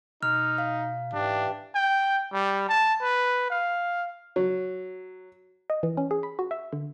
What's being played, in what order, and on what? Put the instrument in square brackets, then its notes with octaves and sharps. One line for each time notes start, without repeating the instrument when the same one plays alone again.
[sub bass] B2 [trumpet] D#4 [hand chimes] F6
[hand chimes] F5
[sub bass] G#2 [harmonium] E3 G4 [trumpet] D4
[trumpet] G5
G3
A5
B4
F5
[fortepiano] F#3
[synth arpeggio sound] D#5
E3
C#4
G#4
B5
F#4
E5
D3